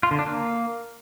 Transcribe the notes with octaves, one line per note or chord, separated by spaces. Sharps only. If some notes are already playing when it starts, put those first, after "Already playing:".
F4
D3
D4
A#3